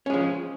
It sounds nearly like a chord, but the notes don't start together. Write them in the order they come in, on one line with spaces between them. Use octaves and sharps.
C#4 G#3 F3